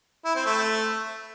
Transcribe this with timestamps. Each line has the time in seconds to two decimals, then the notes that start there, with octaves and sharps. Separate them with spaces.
0.25 E4
0.35 C4
0.46 A3